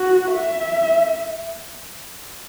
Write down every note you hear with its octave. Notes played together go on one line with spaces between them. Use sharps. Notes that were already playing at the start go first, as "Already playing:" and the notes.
Already playing: F#4
E5